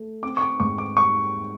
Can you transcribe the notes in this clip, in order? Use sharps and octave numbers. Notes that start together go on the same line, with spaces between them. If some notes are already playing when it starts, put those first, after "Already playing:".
Already playing: A3
C4 D6
C#6
D6
G#2 C#6
D6
G3 C#6